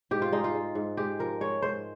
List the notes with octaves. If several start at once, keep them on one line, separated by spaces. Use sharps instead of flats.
G#2 G4
F4
G#3 D#4
F4
G#3
G#2
G#3 G4
F3 A#4
G#3 C#5
G#2 C5